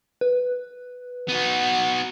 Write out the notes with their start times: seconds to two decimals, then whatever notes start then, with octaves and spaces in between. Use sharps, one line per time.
0.21 B4
1.29 B3 D#4 F#4